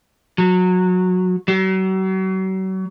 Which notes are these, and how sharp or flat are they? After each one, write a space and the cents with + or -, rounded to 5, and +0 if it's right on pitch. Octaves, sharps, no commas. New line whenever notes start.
F#3 -20
F#3 +40